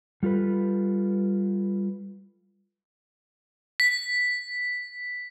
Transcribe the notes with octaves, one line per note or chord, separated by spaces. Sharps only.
G3 F4 A4 B4
B6